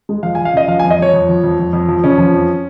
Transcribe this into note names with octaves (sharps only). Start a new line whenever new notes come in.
G#3
F3 F5
F3 G#5
F5
C#3 D#5
F3 F5
F2 G#5
D#5
F2 C#5
F2
F3
F2
F2
F2
F3
C#3 C#4
F3
F2